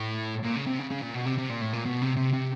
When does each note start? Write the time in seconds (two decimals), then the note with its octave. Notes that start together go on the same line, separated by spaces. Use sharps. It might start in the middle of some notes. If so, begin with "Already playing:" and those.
Already playing: A2
0.43 A#2
0.56 C#3
0.66 C3
0.79 C#3
0.91 C#3
1.02 A#2
1.14 B2
1.26 C3
1.38 C3
1.50 A#2
1.61 A2
1.73 A#2
1.85 B2
2.02 C3
2.16 C3
2.33 C3